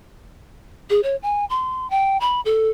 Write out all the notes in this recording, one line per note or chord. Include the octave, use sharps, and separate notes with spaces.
G#4
C#5
G#5
C6
G5
B5
A4